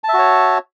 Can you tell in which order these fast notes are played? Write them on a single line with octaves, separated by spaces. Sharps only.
A5 E5 F#4 C#5